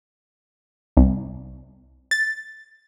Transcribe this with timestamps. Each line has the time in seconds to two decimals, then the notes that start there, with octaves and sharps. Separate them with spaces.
0.97 C2
2.11 A6